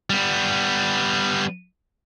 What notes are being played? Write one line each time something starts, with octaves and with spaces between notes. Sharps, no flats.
G3 B3